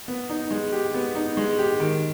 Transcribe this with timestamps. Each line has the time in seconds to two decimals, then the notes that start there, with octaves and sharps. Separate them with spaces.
0.08 B3
0.29 D#4
0.51 G#3
0.72 G4
0.94 B3
1.15 D#4
1.37 G#3
1.58 G4
1.80 D#3